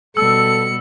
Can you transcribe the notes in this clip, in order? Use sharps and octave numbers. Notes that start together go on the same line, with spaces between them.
B2 G3 A4 E6 C#7